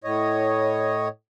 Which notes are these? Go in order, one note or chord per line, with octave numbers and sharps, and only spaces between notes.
A2 C#5 D#5